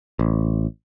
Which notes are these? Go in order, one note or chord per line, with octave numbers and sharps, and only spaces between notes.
A1